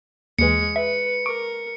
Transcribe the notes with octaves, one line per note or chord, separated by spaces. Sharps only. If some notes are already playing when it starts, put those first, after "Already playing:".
D#2 E3 G#3 C#7
B4 E5
A#4 C#6 D6 D7